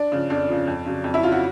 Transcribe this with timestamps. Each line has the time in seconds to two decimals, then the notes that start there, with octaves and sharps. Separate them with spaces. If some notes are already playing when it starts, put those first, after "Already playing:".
Already playing: D4
0.12 C#3 F3
0.30 F2 D4
0.49 C#3 F3
0.67 F2
0.86 C#3 F#3
1.04 F2
1.14 E4
1.23 C#3 F4
1.26 F#3
1.32 F#4